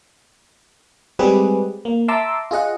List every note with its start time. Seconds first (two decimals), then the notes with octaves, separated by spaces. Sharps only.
1.19 G3 G#3 C4 G4 G#4 B4
1.85 A#3
2.08 E5 A5 A#5 C6 D6 E6
2.51 F4 G#4 D#5 F#5